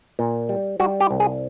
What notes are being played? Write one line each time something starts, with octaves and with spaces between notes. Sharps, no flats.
A#2
G3
G3 F#4
G4
C2
G#4